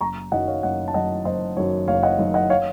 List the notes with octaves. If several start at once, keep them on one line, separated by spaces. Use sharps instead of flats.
F#1 A#5 C#6
F#2 D#3 F#3 D#5 F#5
C#5 F5
F#1 D#5 F#5
A5
F#2 D#3 F#3 D#5 F#5
F#1 C5 D#5
F#2 D#3 F#3 C#5
F#1 C#5 F5
D#5 F#5
F#2 D#3 F#3
D#5 F#5
C#5 F5